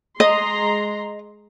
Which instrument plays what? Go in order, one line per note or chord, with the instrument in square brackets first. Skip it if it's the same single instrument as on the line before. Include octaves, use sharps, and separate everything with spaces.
[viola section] G#3 A#5 C6 [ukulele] D#5